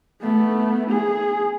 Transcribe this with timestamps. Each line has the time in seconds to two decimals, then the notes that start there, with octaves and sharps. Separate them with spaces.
0.22 A3 B3
0.90 G#4